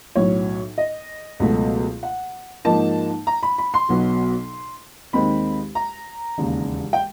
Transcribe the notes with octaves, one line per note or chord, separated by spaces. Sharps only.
B1 A2 F#3 C#5
D#5
C#2 B2 F#3 A3
F#5
G#2 F3 A#3 D#4 A5
A#5
B5
B5
C6
B1 B2 F#3 B3
D#2 D#3 G#3 C4 B5
A#5
E1 D#2 C#3
G5